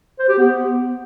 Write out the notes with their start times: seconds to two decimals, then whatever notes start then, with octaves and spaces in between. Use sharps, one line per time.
0.19 C5
0.28 G4
0.38 B3